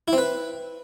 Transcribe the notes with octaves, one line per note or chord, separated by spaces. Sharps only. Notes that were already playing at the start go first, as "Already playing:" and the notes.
E4
C4
B4